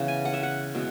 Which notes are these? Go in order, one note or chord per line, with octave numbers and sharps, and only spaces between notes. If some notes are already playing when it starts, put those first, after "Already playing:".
Already playing: C#3 E3 B3
G#5
F#5
E5
F#5
B2 G#3 B3 E4